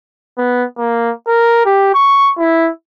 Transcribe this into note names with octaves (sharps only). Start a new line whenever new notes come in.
B3
A#3
A#4
G4
C#6
E4